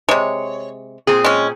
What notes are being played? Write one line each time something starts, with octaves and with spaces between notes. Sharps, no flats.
C3 G#3 C#5
A#2 C4 G#4
G#3 C#4